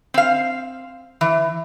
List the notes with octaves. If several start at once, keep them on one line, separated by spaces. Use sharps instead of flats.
C4 F5
E3